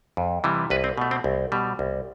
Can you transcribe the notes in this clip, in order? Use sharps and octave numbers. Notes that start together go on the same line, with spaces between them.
F2
C3 E3 G3
C2 B4
C4
B2 A3
C4
C2
B2 G3
C2